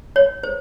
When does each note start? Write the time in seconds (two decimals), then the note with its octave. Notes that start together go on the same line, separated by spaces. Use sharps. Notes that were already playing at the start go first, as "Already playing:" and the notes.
0.16 C#5
0.43 C5